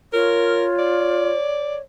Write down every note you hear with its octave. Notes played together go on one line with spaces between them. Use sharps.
F4 A#4 C#5
D5